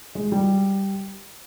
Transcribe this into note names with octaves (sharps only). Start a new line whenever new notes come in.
G#3
G3